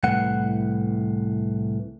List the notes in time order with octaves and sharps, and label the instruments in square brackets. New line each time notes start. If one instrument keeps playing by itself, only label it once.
[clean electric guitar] C2 A2 E3 F#5